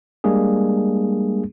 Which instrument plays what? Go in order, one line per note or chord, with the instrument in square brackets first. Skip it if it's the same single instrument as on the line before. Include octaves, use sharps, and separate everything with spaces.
[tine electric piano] G3 G#3 A#3 D4 G#4